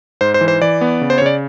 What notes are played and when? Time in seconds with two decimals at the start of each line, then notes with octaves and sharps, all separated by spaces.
0.21 G#2 C5
0.34 C5
0.41 E3
0.48 C5
0.61 E3 D5
0.81 B3
1.01 C#3
1.10 C5
1.18 C#5
1.22 C#3 D5